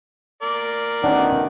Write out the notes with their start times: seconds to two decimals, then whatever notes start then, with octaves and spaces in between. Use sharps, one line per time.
0.42 A#4 D5
1.04 D2 B2 D#3 C#4 D4 F#5